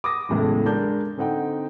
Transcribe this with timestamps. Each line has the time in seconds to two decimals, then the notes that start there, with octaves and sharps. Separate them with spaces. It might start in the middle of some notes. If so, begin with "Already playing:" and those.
0.04 D6 D#6 A#6
0.29 B1 E2 A2 C#3 G#3
0.66 G#3 D4 A#4 G6
1.17 D3 C4 D#4 F#5 G5